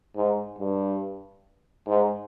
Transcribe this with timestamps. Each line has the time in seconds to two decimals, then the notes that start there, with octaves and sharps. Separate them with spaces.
0.16 G#2
0.59 G2
1.87 G#2